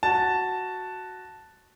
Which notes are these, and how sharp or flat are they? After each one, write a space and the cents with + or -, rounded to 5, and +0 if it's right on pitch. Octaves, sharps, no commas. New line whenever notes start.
F#4 +0 A5 +0